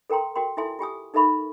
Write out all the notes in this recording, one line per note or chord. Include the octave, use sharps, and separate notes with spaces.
A4 A#4 G5 A#5 C6
F#4 A#4 G5 C6
E4 F4 A4 E5 G#5 C6
F4 G4 G#5 D#6
D#4 A4 A#4 E5 B5 C#6